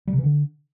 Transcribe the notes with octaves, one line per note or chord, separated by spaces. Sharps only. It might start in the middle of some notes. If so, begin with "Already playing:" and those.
G3
C3
E3
D3